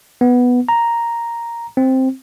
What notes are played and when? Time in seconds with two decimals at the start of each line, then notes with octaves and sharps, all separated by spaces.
0.21 B3
0.69 A#5
1.77 C4